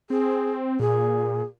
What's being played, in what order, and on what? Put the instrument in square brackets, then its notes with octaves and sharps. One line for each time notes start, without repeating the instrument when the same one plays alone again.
[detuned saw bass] C4 [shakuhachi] G#4
[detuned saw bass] A#2 [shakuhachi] G#4